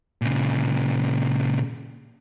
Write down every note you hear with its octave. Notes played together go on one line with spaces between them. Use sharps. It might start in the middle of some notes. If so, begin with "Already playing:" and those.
A#2 C#3